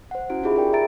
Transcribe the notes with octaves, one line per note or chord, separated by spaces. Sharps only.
C5 F#5
C#4 E4 F#4 D7
D#4 F4 G4 G#4 E5 B5
G#4 A#4 D5 G5
E5 A#5 A6 D7